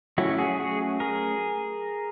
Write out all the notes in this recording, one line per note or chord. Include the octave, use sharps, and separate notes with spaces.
F#3 A3 C#4 E4 F#4
F#4 G#4
F#4 G#4
G#4 A#4